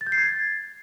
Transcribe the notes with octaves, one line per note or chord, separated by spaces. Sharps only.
A6
G6
C7
G#6
A6